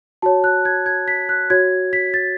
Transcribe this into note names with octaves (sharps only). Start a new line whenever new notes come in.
F#4 C#5 A5
F#6
G#6
G#6
B6
F#6
F#4 C#5 G#6
B6
A6